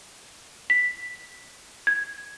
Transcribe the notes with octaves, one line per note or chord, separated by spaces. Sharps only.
B6
G#6